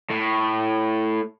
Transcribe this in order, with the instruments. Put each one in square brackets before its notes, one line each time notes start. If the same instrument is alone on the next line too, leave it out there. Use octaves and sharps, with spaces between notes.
[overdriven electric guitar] A2